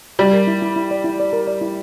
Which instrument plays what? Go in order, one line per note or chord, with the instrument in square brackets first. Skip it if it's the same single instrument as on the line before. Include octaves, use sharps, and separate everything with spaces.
[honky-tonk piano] G3 [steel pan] D5
[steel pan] A#4
E4
E4
E4
D5
E4
D5
A#4
D5
E4